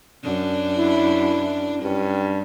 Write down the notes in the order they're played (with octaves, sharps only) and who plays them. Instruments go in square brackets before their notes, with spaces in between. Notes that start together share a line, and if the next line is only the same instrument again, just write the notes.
[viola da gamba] F#2 D4
[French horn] E4
[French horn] G2 [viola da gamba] C#4